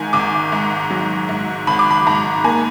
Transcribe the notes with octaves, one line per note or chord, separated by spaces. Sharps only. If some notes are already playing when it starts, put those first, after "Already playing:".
Already playing: G#2 D#3 G#5
G#1 D6
G#2
F#3
G#2
G#1 B5
D6
B5
G#2 A#5
A#3 G#5